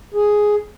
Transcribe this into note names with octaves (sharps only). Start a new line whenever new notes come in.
G#4